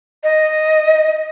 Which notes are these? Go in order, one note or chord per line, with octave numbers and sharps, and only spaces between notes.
D#5